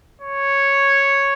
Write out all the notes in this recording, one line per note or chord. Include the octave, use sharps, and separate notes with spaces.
C#5